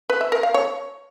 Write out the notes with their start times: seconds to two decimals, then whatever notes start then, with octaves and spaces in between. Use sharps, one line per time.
0.10 B4
0.21 E5
0.32 A#4
0.43 F5
0.54 C#5